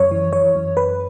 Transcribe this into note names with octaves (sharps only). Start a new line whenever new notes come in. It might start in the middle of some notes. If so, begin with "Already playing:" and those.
Already playing: F#2 C#5
E3
E3 C#5
F#2
F#2 B4